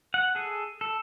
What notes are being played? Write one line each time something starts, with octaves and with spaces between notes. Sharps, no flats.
F#5
G#4 A4
A4